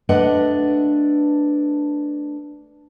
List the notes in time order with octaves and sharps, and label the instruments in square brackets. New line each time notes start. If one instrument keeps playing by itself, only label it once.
[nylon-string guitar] A3 D4 B4 D5 D#5 F#5